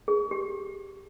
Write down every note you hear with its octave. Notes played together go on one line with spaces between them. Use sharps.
G#4
G4